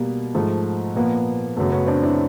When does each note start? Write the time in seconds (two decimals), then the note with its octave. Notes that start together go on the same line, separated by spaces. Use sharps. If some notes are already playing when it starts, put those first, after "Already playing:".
Already playing: B2 G3 A#3
0.35 G#2 F3 A3
0.95 A#2 F3 A#3 B3
1.57 F#2 C#3 F#3 A3 B3
1.72 B3 C#4
1.87 C4 D4
2.03 D4 E4